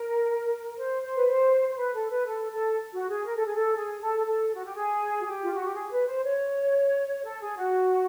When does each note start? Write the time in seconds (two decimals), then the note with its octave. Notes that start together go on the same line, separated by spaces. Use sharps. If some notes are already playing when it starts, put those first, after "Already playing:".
Already playing: A#4
0.77 C5
1.03 C5
1.16 B4
1.27 C5
1.68 C5
1.77 B4
1.94 A4
2.11 B4
2.27 A4
2.51 A4
2.93 F#4
3.09 G#4
3.26 A#4
3.36 A4
3.46 G#4
3.55 A4
3.76 G#4
4.01 A4
4.26 A4
4.55 F#4
4.65 G4
4.75 G#4
5.20 F#4
5.25 G4
5.43 F4
5.54 F#4
5.64 G4
5.75 G#4
5.92 B4
6.08 C5
6.24 C#5
7.24 A4
7.41 G#4
7.57 F#4